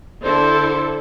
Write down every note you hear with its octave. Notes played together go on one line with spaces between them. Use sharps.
D3 E4 A4 C5